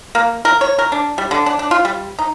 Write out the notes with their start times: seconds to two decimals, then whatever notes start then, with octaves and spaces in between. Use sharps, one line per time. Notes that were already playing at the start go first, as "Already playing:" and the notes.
0.15 A#3
0.45 A#4
0.61 C#5
0.79 A#4
0.92 D4
1.18 G3
1.31 D3
1.46 D4
1.59 D4
1.71 F4
1.85 G3
2.19 D#4